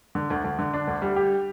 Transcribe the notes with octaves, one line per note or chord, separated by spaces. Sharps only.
D3
D2
D2
D3
D4
D2
G3
G4